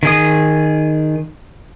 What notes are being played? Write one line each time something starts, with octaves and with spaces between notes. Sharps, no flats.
D#3 G#4 D#6